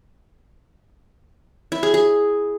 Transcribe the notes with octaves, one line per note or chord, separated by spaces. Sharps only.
E4
G#4
G#4